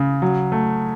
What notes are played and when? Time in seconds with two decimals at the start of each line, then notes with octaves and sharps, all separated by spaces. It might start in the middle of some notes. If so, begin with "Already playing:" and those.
Already playing: C#3
0.22 F#3
0.52 A3